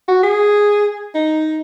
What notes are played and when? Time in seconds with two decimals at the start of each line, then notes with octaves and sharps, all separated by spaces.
0.08 F#4
0.23 G#4
1.15 D#4